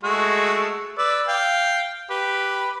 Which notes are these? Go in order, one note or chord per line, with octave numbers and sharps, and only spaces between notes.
G#3 A3 F#4
B4 D5 E6
F5 G5
G4 B4